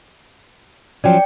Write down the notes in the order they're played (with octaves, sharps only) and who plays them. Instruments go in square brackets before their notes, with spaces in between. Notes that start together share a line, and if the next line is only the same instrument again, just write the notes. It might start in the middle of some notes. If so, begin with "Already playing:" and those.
[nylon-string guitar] F3 F#3 C#4 [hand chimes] D5 G5